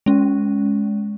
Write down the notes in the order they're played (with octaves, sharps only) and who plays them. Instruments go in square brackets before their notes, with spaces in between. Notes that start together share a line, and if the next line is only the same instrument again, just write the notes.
[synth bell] G#3 C#4